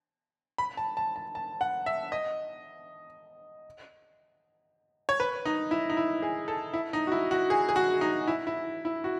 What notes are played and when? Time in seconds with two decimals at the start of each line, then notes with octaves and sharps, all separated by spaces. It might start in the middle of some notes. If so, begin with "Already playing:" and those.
0.58 B5
0.77 A5
0.97 A5
1.16 A5
1.35 A5
1.61 F#5
1.86 E5
2.12 D#5
5.09 C#5
5.20 B4
5.46 D#4
5.71 E4
5.90 D#4
5.97 E4
6.22 G#4
6.48 A4
6.74 E4
6.93 D#4
7.07 F#4
7.12 E4
7.31 F#4
7.50 G#4
7.69 G#4
7.76 F#4
8.01 D#4
8.27 E4
8.47 E4
8.85 E4
9.04 F#4